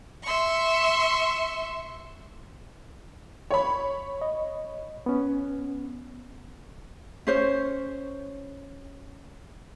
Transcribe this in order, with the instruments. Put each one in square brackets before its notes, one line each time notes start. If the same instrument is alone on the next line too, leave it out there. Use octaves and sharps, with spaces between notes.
[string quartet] E5 C6 C#6
[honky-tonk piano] C#5 B5
[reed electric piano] D#5
B3 C#4
[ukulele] C#4 C5 C#5